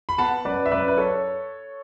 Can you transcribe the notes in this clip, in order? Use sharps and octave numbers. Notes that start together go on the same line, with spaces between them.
B5
B3 F#5 A5
F#2 B4 D5
E5
F#2 B4 D5
B4
A4 C#5